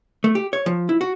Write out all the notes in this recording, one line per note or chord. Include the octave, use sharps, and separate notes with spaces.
A3
G4
C#5
F3
E4
F#4